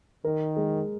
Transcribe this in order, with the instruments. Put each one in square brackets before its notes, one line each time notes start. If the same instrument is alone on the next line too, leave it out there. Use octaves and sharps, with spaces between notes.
[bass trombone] D#3 [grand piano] A#4
[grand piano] G#3